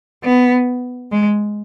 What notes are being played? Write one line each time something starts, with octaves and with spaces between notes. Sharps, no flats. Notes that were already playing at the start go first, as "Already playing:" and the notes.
B3
G#3